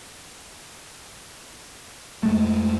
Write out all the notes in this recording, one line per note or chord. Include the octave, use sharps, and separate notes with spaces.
F2 G#3 A3